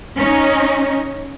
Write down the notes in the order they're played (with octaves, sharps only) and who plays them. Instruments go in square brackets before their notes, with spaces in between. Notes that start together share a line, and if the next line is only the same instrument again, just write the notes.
[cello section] C#4 D#4